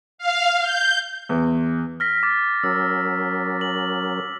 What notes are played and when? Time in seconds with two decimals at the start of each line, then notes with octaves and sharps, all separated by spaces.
0.18 F5
0.60 G6
1.29 E2
2.00 F6 A#6 B6
2.23 D6 A6
2.63 F#3 C#4 A#4 E6
3.61 F#7